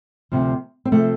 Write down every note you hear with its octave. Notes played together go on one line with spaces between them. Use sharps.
D2 C3 F3
C4
C3 F3 A3